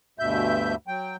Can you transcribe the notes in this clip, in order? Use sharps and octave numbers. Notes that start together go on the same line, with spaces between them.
D2 G2 B2 E5 G6
F#3 G5